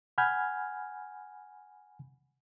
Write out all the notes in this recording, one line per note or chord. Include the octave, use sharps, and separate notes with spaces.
F#5 G#5 B5 F6 G6 G#6